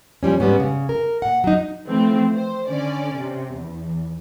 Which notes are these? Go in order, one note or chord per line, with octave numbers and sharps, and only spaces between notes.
A#2 F3 G3 C#4
G#2 G3 G#3 B3 C#4
C#3
A#4
A#2 F#5
F#3 D#4
E3 F3 A3 C4
C5
D3 C#4 D5
C3
E2